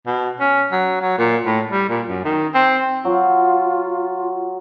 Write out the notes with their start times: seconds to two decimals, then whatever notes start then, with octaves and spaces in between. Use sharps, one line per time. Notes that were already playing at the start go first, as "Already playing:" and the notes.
0.07 B2
0.40 C#4
0.72 F#3
1.02 F#3
1.18 A#2
1.46 A2
1.70 G3
1.90 A#2
2.09 F#2
2.25 D#3
2.54 C4
3.05 F#3 F4